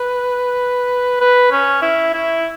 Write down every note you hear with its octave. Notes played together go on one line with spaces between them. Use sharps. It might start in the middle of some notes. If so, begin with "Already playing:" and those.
Already playing: B4
B4
C#4
E4
E4